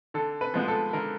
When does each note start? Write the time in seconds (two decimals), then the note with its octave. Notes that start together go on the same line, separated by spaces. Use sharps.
0.14 D3 A4
0.41 B4
0.54 F3 G#3 B3
0.68 A4
0.93 D3 A#4